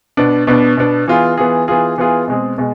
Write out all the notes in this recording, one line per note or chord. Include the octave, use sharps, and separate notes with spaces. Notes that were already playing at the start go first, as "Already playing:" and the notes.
B2 B3 D4
B2 B3 D4
B2 B3 D4
E3 B3 F4 G#4
E3 B3 F4 G#4
E3 B3 F4 G#4
E3 B3 F4 G#4
B2 G#3 C4 G#4
B2 G#3